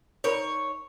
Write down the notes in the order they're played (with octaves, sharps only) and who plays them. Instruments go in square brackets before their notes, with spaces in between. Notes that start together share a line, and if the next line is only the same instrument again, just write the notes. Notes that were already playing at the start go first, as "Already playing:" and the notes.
[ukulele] D#4 A#4 B5 [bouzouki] C#5